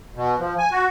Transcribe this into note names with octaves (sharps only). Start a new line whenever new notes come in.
B2
F3
G#5
F#4